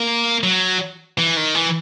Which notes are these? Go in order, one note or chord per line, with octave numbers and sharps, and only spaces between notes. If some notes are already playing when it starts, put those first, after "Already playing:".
Already playing: A#3
F#3
E3
D#3
E3